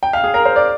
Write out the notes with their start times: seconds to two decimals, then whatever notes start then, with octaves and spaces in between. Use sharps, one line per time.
0.03 G5
0.13 F5
0.24 G#4
0.34 A#4
0.45 C5
0.56 D5